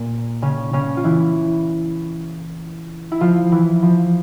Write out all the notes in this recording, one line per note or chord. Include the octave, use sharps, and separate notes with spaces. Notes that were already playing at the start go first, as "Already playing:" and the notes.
Already playing: A#2 A#3
C#3 C#4
C#3 C#4
F4
E3 E4
E4
F3 F4
E3 E4
F3